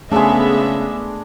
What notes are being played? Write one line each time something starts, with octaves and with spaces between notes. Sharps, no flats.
C#3 G#3 A3 B3 D4 G#4 E5